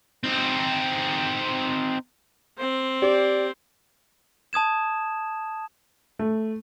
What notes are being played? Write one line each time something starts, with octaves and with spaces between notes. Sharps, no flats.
C4 D#4
C4 C5
G4 D5
A5 D#6 G#6 E7
A3